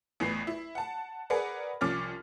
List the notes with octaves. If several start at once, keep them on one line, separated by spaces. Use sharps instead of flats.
A1 E2 E3 B4 C7
E4
F#5 A5
G#4 A#4 B4 D5 F#5
C2 F3 C#4 D6 F6 A6